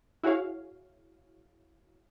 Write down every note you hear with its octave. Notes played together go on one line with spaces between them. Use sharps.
E4 F#4 G#4 C#5 F5